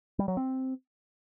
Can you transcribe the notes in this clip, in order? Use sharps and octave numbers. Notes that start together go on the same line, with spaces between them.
G3
F#3
C4